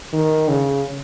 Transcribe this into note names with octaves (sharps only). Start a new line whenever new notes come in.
D#3
C#3